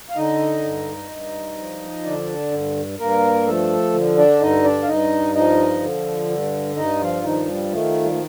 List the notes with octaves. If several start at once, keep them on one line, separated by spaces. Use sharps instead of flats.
F5
D3 D#4 D#5
G2
G2
F3
D3 D4 D5
G2
G2 A#3 A#4
F3 A3 A4
D3
D4 D5
G2 D#4 D#5
D4 D5
F5
G2 D#4 D#5
F3 D#4 D#5
D3
G2
G2 D#4 D#5
F3 F4
D#3 F3 D#4
G3
D#3 A3
G3
A3